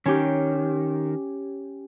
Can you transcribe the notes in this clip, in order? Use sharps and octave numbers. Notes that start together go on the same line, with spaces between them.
D#3 C#4 G4